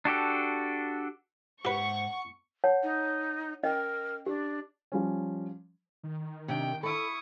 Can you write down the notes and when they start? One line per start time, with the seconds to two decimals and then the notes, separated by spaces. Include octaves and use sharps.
0.05 D4 F#4 G4 A4
1.65 G#2 G4 B4 C5 E5 F#5 C#6
2.64 C#5 F#5 A5
2.83 D#4
3.63 C#4 A#4 D#5 G5
4.26 D4 G4
4.92 F3 G3 C#4
6.03 D#3
6.48 C3 D4 G5
6.83 E4 A4 B5 C#6 D#6